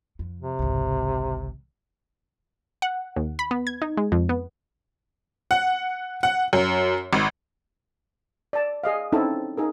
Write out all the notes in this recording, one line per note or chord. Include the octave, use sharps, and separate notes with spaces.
F2
C3
G#1 C#2
F#5
D#2
B5
B3
G#6
D#4
G#3
F2
B3
F#5
F#5
F#2
G#1
D5 A5
G#4 D#5 F5
C4 C#4 D#4 E4 A4
D#4 G#4 A#4